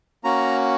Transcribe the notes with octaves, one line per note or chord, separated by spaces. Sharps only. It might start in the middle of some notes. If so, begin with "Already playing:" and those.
A#3 C#4 F#4 A#5